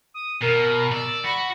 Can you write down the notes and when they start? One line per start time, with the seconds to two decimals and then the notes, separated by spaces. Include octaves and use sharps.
0.14 D#6
0.42 B2 A#4
0.93 D5 E6
1.24 F#4 B5